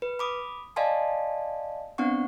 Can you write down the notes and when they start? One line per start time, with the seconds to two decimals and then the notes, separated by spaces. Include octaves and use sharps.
0.02 B4
0.19 B5 D6 D#6
0.76 D5 D#5 F5 G#5 A5 C6
1.98 B3 C4 D4 F#5 C#6